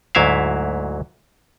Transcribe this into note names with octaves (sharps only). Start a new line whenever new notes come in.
D2 G#2 F#3 E4 E5 F5